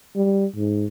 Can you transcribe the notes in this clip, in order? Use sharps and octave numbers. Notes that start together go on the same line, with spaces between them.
G3
G#2